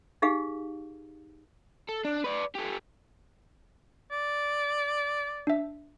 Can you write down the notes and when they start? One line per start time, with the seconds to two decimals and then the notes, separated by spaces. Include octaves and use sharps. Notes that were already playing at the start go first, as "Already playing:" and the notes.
0.22 D#4 G4 G#4 F5
1.89 A4
2.05 D4
2.24 B4 D5
2.55 G4 A4
4.11 D5
5.47 D4 E5